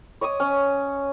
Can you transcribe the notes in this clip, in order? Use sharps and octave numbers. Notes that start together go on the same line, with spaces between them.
C#5 D#5 D6 D#6
C#4